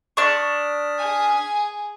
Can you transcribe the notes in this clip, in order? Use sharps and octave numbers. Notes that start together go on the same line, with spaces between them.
D4 C#6 D#6 F6 B6
G#4 G#5